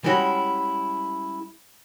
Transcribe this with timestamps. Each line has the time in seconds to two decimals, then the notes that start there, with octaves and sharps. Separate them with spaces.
0.04 G3 G#3 C#4 E4 F#4